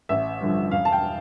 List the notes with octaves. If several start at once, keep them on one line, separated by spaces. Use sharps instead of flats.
A1 E5
G2 D3 F3
E1 F5
A5
G5